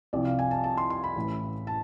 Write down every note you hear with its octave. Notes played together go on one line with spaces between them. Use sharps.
C2 C3 F3 D5
F5
G#5
A5
A5
C6
C6
B5
A1 A2 E3
A5